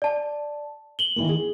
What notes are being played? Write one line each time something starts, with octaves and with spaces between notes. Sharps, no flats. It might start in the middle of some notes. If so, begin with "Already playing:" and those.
D5 A5
F#7 G7
D#3 E3 A#3
G#4